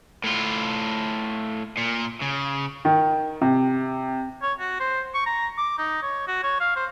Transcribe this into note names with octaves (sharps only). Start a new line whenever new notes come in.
A2 F4
A#2
C#3
D#3
C3
C#5
F#4
C5
C#6
A#5
D6
D#4
C#5
F#4
C#5
F5
C5